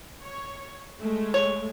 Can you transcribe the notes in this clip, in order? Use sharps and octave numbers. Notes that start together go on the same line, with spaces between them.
C#5
G#3 A3
C#5